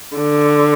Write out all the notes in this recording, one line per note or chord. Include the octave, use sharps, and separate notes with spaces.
D3